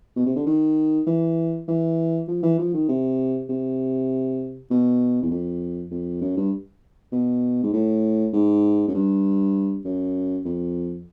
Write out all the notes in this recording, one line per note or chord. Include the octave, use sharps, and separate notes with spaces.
B2
C3
D3
D#3
E3
E3
F3
E3
F3
D#3
C3
C3
B2
E2
F2
F2
F#2
G2
B2
G#2
A2
G#2
F#2
G2
F#2
F2